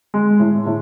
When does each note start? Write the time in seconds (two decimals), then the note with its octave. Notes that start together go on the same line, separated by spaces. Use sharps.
0.14 G#3
0.40 A2
0.66 A2